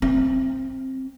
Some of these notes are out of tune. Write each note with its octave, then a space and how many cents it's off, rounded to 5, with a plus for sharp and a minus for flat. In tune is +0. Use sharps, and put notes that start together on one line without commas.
C4 +10